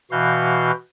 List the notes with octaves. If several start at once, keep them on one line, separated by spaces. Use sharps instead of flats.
B2 E3 F#4 F5 G6